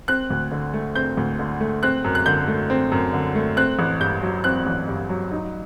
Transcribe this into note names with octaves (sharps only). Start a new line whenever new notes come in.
C4 F#6
D2
D3
A3
C4 G6
D2
D3
A3
C4 F#6
F#2
F#6
D3 G6
A3
C4
F#2
D3
A3
C4 F#6
A1
G2 G6
F#3
C4 F#6
A1
G2
F#3
D#4